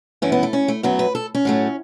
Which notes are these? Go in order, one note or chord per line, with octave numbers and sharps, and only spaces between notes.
F#2 E3 A3 C#4
B3
A3
C#4
A3
F#2 F#3 A3 B3
B4
A4
C#4
A2 F#3 A3